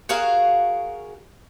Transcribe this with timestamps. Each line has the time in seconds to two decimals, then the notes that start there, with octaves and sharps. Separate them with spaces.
0.09 F#4 G#4 A#4 F5